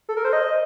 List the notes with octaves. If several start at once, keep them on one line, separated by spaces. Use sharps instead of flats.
A4
A#4
C5
D#5